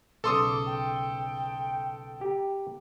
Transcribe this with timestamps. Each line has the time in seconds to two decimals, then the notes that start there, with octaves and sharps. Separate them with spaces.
0.24 B1 C#3 A4 C6 D6 D#6
0.66 G5
2.21 G4 A#5